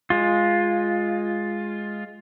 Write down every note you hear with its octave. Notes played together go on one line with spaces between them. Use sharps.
G#3 F4